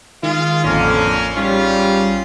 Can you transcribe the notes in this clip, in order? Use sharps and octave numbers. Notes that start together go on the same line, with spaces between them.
D#3 G#3 F4
A1 F2 D3 A#3 C#4
G#2 G3 C#4 F4